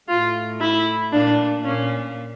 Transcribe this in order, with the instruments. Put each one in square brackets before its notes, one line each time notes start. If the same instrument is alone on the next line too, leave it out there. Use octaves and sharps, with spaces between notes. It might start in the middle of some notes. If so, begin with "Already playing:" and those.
[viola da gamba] A2 [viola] F4
[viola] E4
[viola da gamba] A#2 [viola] D4
[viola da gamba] A#2 [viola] C#4